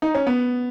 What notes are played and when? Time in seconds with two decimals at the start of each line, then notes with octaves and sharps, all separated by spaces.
0.02 D#4
0.14 C#4
0.27 B3